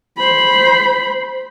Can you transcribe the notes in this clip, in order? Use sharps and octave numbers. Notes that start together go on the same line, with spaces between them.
C5 B5